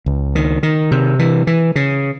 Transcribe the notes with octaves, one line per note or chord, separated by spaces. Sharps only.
C#2
D#3
D#3
C3
E3
E3
C#3